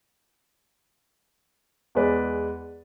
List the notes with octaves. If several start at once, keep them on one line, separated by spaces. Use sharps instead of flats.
E2 G#3 B4 D5